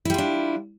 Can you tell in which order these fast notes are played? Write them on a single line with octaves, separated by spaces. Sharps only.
E4 G3 F4 D4